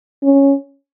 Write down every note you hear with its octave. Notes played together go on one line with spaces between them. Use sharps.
C#4